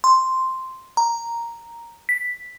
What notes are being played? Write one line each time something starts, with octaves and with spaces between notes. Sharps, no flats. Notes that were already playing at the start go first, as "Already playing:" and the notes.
C6
A#5
B6